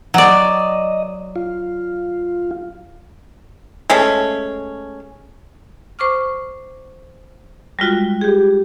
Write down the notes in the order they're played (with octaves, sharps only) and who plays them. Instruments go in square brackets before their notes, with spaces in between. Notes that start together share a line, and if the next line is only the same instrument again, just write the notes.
[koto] F#3 D5 [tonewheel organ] D#5
[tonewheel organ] F4
[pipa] G#3 A3 C#4
[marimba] C5 C#6 D6 F6
G3 G#3 F4 F#4
G4 G#4